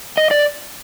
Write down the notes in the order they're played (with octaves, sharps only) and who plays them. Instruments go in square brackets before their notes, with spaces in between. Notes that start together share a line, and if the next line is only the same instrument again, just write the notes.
[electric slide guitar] D#5
D5